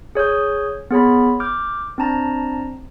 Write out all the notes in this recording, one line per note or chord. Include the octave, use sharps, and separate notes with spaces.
G#4 C#5 D#6 G6
B3 G#4 C#5 B5
D6 F6 G6
C4 D4 A5 A#5